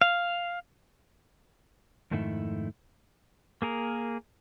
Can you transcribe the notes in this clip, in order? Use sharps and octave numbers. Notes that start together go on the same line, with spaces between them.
F5
F2 G#2 D#3 A3 D#4 E4
A#3 G#4 A#4